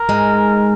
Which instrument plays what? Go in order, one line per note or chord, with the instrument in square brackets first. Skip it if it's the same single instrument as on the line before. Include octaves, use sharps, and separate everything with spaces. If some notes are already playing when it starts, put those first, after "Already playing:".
Already playing: [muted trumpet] A#4
[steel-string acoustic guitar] G#2 G#3